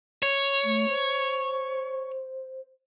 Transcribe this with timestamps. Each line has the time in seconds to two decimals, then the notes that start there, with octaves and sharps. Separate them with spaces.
0.23 C#5
0.64 A3
0.89 C5